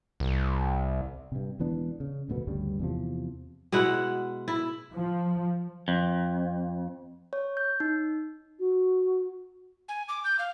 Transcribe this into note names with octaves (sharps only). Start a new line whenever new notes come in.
C2
G2 C3
E1 E3 B3 D4
C#3
F1 D2 B2 B3
D2 G2 C#3 G3
E2 C3 F3
B2 G#3 E4 F#5
E4
F3
F2
C#5
G6
D#4
F#4
G#5
D6
G6
F5